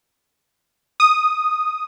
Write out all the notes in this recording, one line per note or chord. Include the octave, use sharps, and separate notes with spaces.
D#6